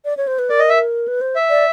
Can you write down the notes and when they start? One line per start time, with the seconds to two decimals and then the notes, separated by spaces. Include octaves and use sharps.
0.05 D5
0.17 C#5
0.27 C5
0.39 B4
0.50 A#4 D5
0.59 D#5
0.69 E5
1.08 B4
1.21 C5
1.36 E5
1.50 D5